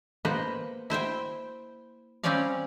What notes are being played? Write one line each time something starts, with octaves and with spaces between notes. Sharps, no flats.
A#3 B3 B4 C5
E4 C5 E5 G5
G3 C4 C#4 C#5 D5 F5